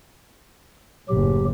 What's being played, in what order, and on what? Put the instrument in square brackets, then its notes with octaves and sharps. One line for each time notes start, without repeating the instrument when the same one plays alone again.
[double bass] F#1 A2 [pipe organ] F#3 G4